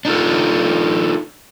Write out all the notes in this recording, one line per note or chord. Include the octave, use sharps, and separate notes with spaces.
D4 D#4 F4 A4